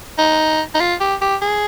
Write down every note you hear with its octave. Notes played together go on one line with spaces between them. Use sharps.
D#4
D#4
F4
G4
G4
G#4